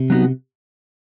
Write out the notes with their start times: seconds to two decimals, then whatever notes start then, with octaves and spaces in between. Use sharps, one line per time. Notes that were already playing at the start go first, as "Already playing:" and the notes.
Already playing: C3
0.10 F#3 B3 D#4 F#4